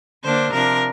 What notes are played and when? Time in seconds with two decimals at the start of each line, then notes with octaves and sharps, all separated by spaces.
0.24 D3 A#3 D4 C5
0.52 C3 F3 D4 A#4